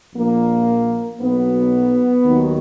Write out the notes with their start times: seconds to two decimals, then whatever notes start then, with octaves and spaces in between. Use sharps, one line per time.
0.15 A#1 A#2 F3 A#3
1.20 B1 B2 F#3 B3
2.25 D#2 D#3 F#3